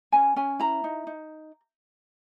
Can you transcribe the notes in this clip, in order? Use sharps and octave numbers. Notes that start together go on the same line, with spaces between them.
C#4 G#5
C#4 G#5
E4 A#5
D#4
D#4